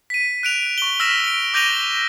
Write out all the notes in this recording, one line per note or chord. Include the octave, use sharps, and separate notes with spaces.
B6 D#7
F#6 D7 F7
C#6 G7
E6 F6 A#6 B6 E7 G7
D7 G7
D6 G6 A#6 D#7 F7 G7